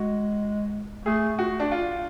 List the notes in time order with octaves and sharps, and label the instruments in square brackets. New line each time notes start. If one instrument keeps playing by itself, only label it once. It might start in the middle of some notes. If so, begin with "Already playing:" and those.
Already playing: [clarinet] G#3 [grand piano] F#4
[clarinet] A3 [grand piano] G#4
[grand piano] F#4
D4
F4